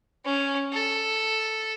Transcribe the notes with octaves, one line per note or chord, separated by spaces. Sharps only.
C#4
A4